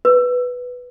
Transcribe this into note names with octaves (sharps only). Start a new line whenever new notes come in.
B4